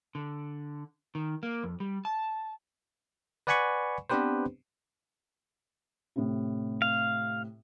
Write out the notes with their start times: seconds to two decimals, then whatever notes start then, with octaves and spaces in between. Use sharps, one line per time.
0.15 D3
1.15 D#3
1.43 A#3
1.64 F2
1.80 G3
2.05 A5
3.47 B4 D5 F#5 G#5 B5 C#6
4.10 B3 C4 D4 G4 B4 C5
6.16 A2 C3
6.82 F5